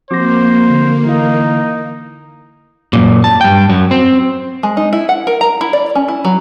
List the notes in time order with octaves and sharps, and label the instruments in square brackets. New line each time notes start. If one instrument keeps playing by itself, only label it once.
[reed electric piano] F3 C4 F#4 [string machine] A#3 [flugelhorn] C5 [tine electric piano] D6 A#6
[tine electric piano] D3
[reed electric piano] E3 E4 F5 [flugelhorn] D#4
[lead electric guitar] F#2 A#2
A5
G2 G5
F#2 F#3
C4
[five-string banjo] G#3
D#4
E4
F#5
A#4
A#5
E4
D5
C#4
E4
F#3